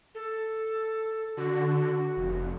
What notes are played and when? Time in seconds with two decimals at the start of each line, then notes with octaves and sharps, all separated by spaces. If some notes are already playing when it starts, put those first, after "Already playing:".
0.15 A4
1.37 D3 F#4
2.17 F1